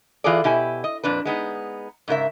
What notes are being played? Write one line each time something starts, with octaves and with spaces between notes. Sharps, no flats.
E3 F4 F#4 G#4 A4 D5
B2 E4 G4 G#5
D#5
F2 A#2 D4 B4
G#3 B3 D#4
G#2 C#3 A#4 E5